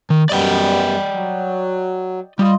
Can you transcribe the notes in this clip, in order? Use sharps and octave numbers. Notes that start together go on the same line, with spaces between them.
D#3
F#2 G3 B3 D5 D#5 G5
F#3
G3 F4 D#5